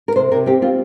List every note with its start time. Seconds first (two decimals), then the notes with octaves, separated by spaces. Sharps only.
0.08 A#4
0.16 C3 C5
0.31 C3 A#4
0.46 C4 G4
0.62 C4 F4